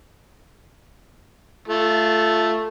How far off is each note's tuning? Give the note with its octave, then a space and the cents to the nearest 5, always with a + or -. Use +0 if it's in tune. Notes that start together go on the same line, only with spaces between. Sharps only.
A3 +0 F4 -10